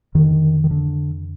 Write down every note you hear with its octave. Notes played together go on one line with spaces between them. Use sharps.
F2 D3 D#3
D#3
D3